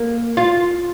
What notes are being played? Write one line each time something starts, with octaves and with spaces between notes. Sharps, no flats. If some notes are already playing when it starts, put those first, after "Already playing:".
Already playing: A#3
F4